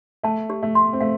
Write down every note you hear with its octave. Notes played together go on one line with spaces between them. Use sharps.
A3 A5
G4
A3
C6
C4
A3 F5